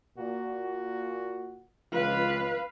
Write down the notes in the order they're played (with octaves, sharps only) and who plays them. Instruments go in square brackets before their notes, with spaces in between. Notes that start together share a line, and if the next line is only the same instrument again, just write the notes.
[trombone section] A#2 F#4
[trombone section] C#2 F4 [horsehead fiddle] B4 F5